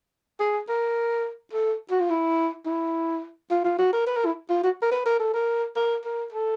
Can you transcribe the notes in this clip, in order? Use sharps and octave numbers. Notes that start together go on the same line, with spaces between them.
G#4
A#4
A4
F#4
F4
E4
E4
F4
F4
F#4
A#4
B4
A#4
E4
F4
F#4
A#4
B4
A#4
A4
A#4
A#4
A#4
A4